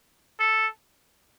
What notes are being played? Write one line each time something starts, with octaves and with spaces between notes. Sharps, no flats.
A4